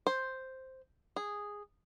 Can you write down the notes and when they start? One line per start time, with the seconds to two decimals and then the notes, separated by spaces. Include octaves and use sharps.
0.07 C5
1.16 G#4